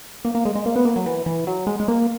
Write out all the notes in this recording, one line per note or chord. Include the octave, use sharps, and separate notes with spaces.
A#3
A#3
G#3
G#3
A#3
B3
A#3
F#3
E3
E3
F#3
G#3
G#3
A#3